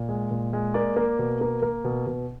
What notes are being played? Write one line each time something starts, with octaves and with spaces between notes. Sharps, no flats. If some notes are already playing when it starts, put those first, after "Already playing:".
Already playing: A#2
G#3
A#2
G#3
A#3 D5
A#3
B2
A#3
A#3
B2
B2